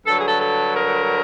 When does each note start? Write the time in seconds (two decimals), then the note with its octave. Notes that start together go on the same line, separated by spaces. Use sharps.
0.06 G2 D3 F#3 A4
0.16 G#4
0.26 A4
0.40 A4
0.74 A#4